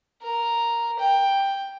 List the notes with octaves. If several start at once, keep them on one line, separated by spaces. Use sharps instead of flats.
A#4
G5